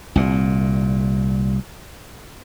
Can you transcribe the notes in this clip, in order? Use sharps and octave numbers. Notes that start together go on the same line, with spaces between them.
C2 A#2